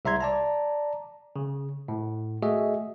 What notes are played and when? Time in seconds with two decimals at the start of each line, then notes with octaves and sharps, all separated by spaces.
0.05 C2 E5 A#5 C6 G#6
0.21 D5 A5 A#5
1.36 C#3
1.88 A2
2.42 A3 F#4 G#4 D#5 E5